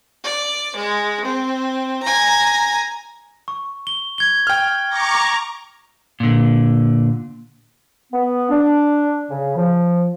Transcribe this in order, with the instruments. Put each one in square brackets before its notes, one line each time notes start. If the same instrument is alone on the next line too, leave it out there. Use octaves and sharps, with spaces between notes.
[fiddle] D5
G#3
C4
G#5 A#5
[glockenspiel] C#6
G7
G#6 G7
[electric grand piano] G5 F6
[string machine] A#5 C#6 D6
[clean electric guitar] A#2 D3
[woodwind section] B3
D4
C#3
F3